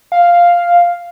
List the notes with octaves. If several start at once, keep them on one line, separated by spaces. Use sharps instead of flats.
F5